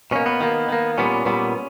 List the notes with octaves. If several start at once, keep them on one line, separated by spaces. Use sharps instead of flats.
B2 A#3 C#4
B3
D#3 A#3
D#3 A#3
A#2 G3 B3 C#4
A#2 G3 B3